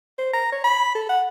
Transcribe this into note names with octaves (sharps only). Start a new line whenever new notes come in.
C5
A#5
C#5
B5
A4
F#5